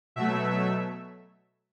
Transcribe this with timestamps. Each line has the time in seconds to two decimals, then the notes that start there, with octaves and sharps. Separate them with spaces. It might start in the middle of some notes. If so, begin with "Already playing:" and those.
0.16 B2 F#3 A3 E5